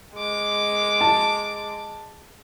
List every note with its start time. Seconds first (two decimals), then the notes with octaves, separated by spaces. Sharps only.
0.14 G#3 D6
1.01 A5